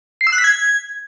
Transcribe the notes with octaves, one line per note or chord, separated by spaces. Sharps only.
C7
E6
F#6
B6
G#6